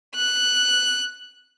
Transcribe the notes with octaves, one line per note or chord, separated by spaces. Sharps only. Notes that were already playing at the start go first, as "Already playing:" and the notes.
F#6